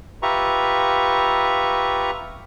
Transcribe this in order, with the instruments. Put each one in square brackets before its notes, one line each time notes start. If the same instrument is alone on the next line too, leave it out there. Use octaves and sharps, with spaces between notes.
[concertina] F4 G4 B4 E5 A#5 C#6